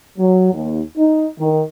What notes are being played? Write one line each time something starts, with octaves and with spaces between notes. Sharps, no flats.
F#3
D#2
D#4
D#3